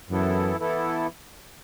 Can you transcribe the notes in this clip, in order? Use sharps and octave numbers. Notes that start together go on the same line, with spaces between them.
F#2 E3 B3 E4 A4
E3 B3 E4 A4